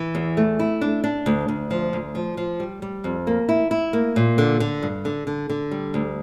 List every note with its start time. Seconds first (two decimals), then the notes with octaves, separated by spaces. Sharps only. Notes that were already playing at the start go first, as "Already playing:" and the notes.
Already playing: E3
0.15 E2
0.37 A3
0.59 E4
0.81 D4
1.04 D4
1.26 D2
1.48 D2
1.71 F3
1.93 D2
2.15 F3
2.37 F3
2.60 G3
2.82 G3
3.04 F2
3.27 A#3
3.49 E4
3.71 E4
3.93 A#3
4.16 A#2
4.38 D3
4.60 D3
4.83 G2
5.05 D3
5.27 D3
5.50 D3
5.71 G3
5.94 D2